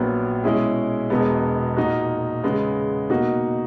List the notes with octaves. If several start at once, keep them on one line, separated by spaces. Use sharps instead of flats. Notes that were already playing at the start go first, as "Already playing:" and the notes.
Already playing: A#1 A#2 F#3 B3
B2 G#3 C#4 E4 G#4
E1 E2 B2 G#3 B3
A#2 A#3 D#4 F#4
E2 C#3 G#3 B3
B2 A#3 D#4 F#4